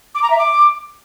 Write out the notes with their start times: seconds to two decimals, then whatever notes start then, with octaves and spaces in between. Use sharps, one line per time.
0.15 D6
0.23 A#5
0.31 E5
0.39 D6